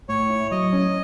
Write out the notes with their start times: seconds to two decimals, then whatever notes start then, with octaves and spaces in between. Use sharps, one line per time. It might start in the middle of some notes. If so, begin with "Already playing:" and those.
0.09 A2 C#5
0.30 E4
0.51 F#3 D#5
0.73 C#4